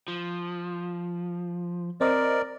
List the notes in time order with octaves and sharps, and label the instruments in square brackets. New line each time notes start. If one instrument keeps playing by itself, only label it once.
[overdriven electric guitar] F3
[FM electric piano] C4 C5 D#5 [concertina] A#4 D5